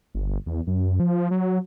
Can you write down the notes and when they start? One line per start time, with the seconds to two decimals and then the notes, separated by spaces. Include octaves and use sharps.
0.15 G1
0.46 E2
0.67 F#2
1.00 F3
1.31 F#3